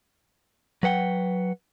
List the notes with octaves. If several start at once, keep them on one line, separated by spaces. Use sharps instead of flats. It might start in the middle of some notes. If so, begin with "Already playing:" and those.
F#3 B4 F#5 G5